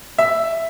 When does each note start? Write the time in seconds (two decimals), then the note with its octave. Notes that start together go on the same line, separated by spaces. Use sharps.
0.18 E5